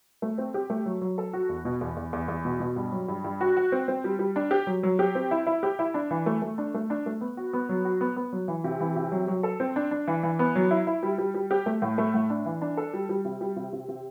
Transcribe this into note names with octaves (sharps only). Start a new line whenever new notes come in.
A3
C4
G4
A3
F#3
F#3
A4
F#4
E2
B2
E2
E2
E2
E2
B2
B2
G2
F#3
G2
G2
F#4
F#4
C4
C4
G3
G3
D4
G4
F#3
F#3
G4
C4
E4
E4
G4
E4
D4
E3
A3
A3
D4
A3
D4
A3
B3
F#4
B3
F#3
F#4
B3
B3
F#3
E3
C3
E3
C3
F#3
F#3
A4
C4
D4
D4
E3
E3
B3
F#3
E4
E4
G3
G3
G3
G4
A3
A2
A3
A2
D4
E3
D4
A4
G3
G3
C3
G3
C3
C3
C3